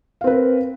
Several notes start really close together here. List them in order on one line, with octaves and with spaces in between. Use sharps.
F5 C4 B4 A#4